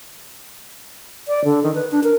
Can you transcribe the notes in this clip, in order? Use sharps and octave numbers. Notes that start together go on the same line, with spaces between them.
D5
D3
D#3
B4
D4
A#4